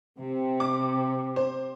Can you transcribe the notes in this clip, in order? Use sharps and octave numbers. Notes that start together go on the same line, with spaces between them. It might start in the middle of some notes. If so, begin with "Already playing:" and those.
C3
D6
C5